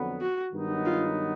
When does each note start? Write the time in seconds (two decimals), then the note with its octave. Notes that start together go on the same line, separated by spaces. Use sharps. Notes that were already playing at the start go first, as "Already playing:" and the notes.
Already playing: F2 D3 F#3 B3
0.21 F#4
0.53 G2 D#3 F#3 B3 D#4
0.85 F4